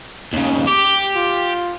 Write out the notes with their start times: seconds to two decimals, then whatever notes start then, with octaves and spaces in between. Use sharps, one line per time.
0.33 D#2 C#3
0.67 G4 D6
1.16 F4